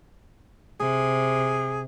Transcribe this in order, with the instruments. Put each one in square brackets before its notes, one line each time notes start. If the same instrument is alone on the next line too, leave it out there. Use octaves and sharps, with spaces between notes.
[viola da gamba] C3 [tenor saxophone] G#4